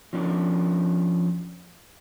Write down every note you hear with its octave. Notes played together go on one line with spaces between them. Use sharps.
F3 C#4 D4